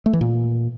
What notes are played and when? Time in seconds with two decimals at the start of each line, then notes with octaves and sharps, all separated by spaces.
0.06 A3
0.13 E3
0.21 A#2